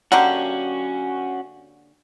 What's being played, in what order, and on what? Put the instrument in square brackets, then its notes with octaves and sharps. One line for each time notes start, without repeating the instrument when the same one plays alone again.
[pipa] D3 A#3 G4 [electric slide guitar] C#4 F#4 [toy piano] F#5 G#5